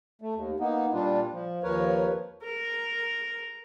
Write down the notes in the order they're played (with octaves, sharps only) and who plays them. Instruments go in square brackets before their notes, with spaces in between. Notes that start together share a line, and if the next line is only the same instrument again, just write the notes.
[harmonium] A3
D#2
A#3 B3 D#4
A#2 G3 D4 F4
F3
D#2 F3 A#4 B4 C#5
[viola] A#4